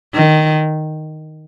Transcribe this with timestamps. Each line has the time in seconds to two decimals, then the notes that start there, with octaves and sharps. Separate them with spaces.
0.14 D#3